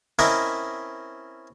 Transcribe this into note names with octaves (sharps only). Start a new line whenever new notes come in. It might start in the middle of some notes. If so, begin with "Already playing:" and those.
C4 C#4 E4 A#4 D#5 E5